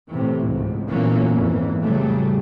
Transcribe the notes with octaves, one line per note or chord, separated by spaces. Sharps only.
A2 C3 E3
C#2 G#2
A#2 E3 F#3 A#3 B3 C#4
F2 G#2 E3
A2 C#3 F#3 G3 A3